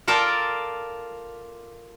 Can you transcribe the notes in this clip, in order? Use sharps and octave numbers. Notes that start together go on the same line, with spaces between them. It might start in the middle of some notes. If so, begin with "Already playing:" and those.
F4 A4 A#4 D5 G5 A5